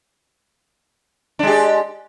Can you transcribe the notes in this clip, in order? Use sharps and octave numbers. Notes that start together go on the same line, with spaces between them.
G#3 D4 G4